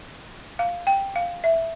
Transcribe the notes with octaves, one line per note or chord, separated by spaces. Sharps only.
F5
G5
F5
E5